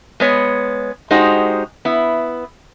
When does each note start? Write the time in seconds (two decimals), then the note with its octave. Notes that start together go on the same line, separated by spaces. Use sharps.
0.20 G#3 B3 C#5
1.11 G#3 D#4 F#4 G4 C5
1.85 B3 E4